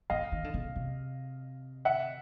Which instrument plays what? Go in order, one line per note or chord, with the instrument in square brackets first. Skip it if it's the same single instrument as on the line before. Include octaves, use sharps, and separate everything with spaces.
[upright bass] D3 [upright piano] D#5 F5
[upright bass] D#3
D3
C#3
C3
[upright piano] E5 F#5